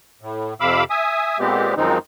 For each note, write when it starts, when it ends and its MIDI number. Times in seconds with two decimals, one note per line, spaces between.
0.21 0.54 45
0.60 0.84 41
0.60 0.84 48
0.60 0.84 77
0.60 0.84 83
0.60 0.84 86
0.60 0.84 88
0.90 1.38 76
0.90 1.38 80
0.90 1.38 87
1.39 1.75 46
1.39 1.75 56
1.39 1.75 59
1.39 1.75 60
1.39 1.75 67
1.77 1.98 42
1.77 1.98 51
1.77 1.98 53
1.77 1.98 56
1.77 1.98 60
1.77 1.98 63